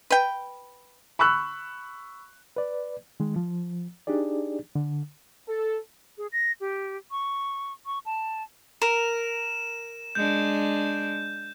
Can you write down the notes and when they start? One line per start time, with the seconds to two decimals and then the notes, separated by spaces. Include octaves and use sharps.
0.10 B4 G5
1.19 B5 C#6 E6 F#6
2.57 B4 D5
3.20 D#3 G#3
3.36 F3
4.07 D4 D#4 G4 G#4 D5
4.75 D3
5.48 A4
6.18 G#4
6.32 A#6
6.61 G4
7.11 C#6
7.86 C#6
8.06 A5
8.82 A#4 E7
10.15 G#3 D4 G6